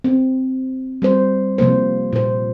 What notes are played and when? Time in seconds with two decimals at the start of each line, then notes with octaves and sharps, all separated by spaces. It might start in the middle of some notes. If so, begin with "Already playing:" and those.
0.04 C4
1.02 G3 C4 C5
1.58 C3 F3 A#3 C5
2.13 A#2 C5